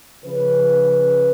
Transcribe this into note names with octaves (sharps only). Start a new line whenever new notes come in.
C#3 F3 B4